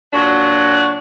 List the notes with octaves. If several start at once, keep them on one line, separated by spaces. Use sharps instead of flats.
A#2 F#3 D4 F#4